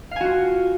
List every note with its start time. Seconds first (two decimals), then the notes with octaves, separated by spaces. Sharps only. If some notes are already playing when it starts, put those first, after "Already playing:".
0.11 F5
0.16 G#5
0.21 F#4
0.25 F4